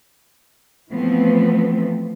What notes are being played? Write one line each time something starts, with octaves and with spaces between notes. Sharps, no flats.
E3 F3 A3 B3 C4